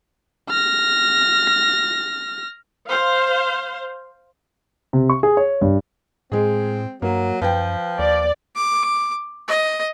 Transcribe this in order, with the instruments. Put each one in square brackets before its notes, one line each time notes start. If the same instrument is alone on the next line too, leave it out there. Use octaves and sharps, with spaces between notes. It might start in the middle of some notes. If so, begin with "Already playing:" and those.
[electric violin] F6 A#6
[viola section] C5 F5
[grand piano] C3
C#6
G#4
C#5
G2
[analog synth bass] A2 [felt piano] G#3 G#4 [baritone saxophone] C4
[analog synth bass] G2 [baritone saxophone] F#3 [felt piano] A#3
[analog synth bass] F#2 [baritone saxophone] F3 [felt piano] B4 G5
[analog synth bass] D#2 [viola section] D5
[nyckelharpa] D6
D#5